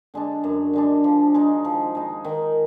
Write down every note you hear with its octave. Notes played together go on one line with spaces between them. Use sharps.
D3 G#3 D4
F#2
D3 G#3 D4
F3
G#3 D#4
F3
G#3 D#4
D#3